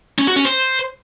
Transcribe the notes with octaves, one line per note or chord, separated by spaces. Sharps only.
C#4
F#4
C#4
C5